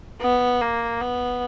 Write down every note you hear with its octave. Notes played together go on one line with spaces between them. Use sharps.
B3
A#3
B3